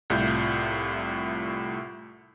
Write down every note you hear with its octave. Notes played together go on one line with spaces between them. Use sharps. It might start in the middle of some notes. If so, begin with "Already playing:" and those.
C2 A2 E4 F4 G6